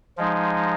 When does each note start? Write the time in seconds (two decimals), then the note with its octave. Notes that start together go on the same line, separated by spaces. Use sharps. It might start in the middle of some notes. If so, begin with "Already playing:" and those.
0.17 F3 G#3 D#4